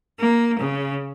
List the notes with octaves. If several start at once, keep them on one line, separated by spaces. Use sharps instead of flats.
A#3
C#3